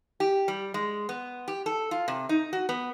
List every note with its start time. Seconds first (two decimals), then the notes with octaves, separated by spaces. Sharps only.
0.20 G4
0.48 G3
0.74 G#3
1.09 B3
1.48 G4
1.66 A4
1.91 F4
2.08 C3
2.29 D#4
2.53 F#4
2.69 B3